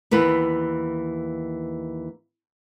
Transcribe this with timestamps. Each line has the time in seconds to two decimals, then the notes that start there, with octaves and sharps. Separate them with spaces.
0.11 D#2 E3 B3 B4